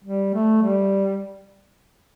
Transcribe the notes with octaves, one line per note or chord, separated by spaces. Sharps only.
G3
A3
G3